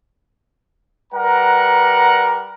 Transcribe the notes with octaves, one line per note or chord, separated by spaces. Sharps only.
G3 A#4 B4 F#5 A#5